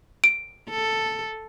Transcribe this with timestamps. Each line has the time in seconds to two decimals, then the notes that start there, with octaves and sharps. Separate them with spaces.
0.24 D7
0.70 A4